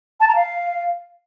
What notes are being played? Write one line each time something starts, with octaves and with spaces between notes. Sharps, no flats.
A5
A#5
F5